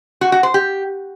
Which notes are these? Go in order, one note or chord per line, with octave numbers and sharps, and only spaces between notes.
F#4
F#4
C5
G4